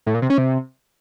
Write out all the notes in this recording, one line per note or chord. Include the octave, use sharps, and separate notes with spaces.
A2
A#2
C3
C#4
C3